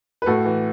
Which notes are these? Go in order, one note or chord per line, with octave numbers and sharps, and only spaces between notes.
B4
A2 F#4 A4
E3